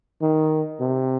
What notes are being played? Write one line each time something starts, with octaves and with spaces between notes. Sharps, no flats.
D#3
C3